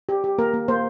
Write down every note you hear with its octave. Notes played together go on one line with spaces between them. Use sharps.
G4
G4
A#3 A#4
A#3
A#3 C5